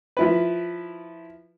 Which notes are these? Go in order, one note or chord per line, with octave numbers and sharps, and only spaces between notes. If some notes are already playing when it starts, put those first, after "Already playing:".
F3 E4 B4